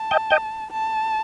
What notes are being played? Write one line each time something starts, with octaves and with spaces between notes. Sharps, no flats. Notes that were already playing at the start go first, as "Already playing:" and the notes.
Already playing: A5
D#5 G5
D#5 G5
A5